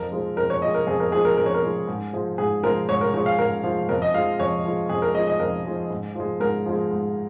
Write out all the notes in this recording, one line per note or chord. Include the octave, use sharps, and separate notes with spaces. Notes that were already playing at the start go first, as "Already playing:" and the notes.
Already playing: F2 A#4
F3 G#3
F2 A#4
C#5
F3 G#3 D#5
A#4
F2 G#4
A#4
F3 G#3 G#4
A#4
F2 A#4
C#5
A#4
F3 G#3
G#2
F3 G#3
G#2 G#4
F3 G#3 A#4
G#2 C#5
A#4
F3 G#3 C#5
F5
G#2 A#4
F3 G#3
F2 A#4
D#5
F3 G#3 F5
F2 C#5
F3 G#3
F2 G#4
A#4
F3 G#3 D#5
D#5
F2 A#4
F3 G#3
G#2
F3 G#3
G#2 A#4
F3 G#3
G#2